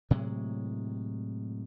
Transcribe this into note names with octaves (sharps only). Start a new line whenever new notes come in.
A2 C3 F#3 G#3